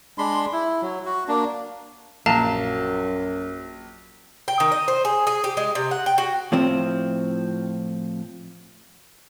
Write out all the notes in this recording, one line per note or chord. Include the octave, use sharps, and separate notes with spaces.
G#3 D4 B5 C6
E4
F#3
F#4
A#3 D4
A#1 F#2 F5 A5 A#5
G5
D#3
D#5
C5
G#4
G#4
G4
G#3
C3
F#5
G5
F#4
A2 F3 C4